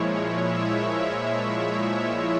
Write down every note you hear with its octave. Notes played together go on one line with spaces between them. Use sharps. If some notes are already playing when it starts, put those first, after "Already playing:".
Already playing: A#2 F3 G#3 E4 C#5
E5